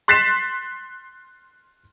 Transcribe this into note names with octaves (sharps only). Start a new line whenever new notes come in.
C6 F#6 A6 B6 C7 E7